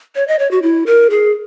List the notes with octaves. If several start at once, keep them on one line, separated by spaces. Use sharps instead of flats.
C#5
D#5
C#5
F#4
E4
A#4
G#4